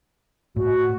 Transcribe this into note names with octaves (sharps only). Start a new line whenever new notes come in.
A2 F#4